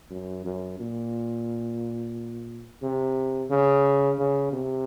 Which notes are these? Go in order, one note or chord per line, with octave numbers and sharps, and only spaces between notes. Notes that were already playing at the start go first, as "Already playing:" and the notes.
F#2
F#2
A#2
C3
C#3
C#3
C3